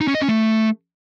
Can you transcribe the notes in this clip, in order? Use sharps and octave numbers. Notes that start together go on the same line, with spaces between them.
D#4
C#4
D#5
C#4
A3